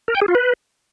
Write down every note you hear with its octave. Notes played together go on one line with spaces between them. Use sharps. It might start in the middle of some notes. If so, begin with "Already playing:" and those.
A#4
G5
G#4
F4
B4